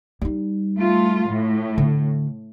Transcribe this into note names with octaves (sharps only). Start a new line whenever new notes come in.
G3 D#4
A3 F4
A2
D3